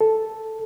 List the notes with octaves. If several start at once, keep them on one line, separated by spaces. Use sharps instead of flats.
A4